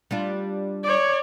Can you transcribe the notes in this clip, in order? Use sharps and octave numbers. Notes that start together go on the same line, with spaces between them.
G3 D4 F4
C#5 D5